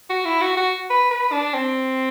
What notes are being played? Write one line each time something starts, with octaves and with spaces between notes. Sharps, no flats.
F#4
E4
F#4
F#4
B4
B4
D4
C4